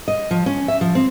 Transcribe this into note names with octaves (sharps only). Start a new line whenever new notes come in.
D#5
F3
C#4
E5
F3
C4